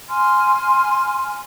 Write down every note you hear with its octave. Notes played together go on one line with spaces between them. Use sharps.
G#5 C6 F6